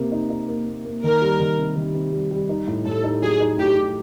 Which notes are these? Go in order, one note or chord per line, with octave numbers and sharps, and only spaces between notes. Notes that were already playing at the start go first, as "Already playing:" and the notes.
Already playing: C3 A#3
D#4
D#4
A#3
A#3
A#3
D#3 A#4
G3
D#3
C3
D#3
C3
G3
G3
D#4
A2
A2 A4
D#4
F#3 G#4
D#4
A2 G4
A2